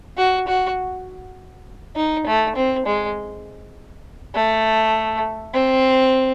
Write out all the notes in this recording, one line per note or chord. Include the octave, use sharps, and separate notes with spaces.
F#4
F#4
D#4
A3
C4
G#3
A3
C4